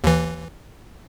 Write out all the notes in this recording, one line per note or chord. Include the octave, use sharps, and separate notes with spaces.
D#2 E3